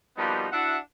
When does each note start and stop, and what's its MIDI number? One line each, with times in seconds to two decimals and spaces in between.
0.18 0.47 47
0.18 0.47 53
0.18 0.47 55
0.18 0.47 58
0.18 0.47 59
0.18 0.47 63
0.52 0.77 62
0.52 0.77 64
0.52 0.77 66
0.52 0.77 76
0.52 0.77 78